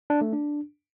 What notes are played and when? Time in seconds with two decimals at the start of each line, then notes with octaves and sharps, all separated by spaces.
0.10 D4
0.21 A3
0.33 D4